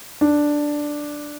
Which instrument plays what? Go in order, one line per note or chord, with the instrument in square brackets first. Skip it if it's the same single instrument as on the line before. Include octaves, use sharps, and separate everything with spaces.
[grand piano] D4